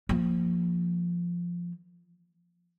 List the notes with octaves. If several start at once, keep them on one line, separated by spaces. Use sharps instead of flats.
F3 A#3